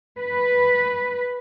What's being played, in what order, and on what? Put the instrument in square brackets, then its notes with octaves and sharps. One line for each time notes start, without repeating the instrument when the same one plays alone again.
[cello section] B4